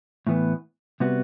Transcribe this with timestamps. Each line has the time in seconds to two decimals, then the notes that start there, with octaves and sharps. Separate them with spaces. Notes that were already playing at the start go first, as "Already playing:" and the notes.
0.27 A2 E3 B3
1.00 C3 G3 B3 F#4